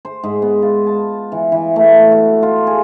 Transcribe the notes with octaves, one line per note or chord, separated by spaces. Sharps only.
C5
G#2
B3
F4
A5
E3
E3
A3
F#4
F4
G#4